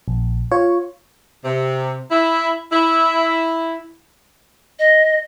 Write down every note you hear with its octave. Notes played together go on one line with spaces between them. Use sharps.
A#1
F4 C#5
C3
E4
E4
D#5